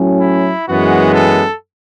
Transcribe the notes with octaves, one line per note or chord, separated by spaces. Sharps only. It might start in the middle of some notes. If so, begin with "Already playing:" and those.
Already playing: A2 F#3 C#4
E4
F#2 E3 G#3 B3 F#4
A4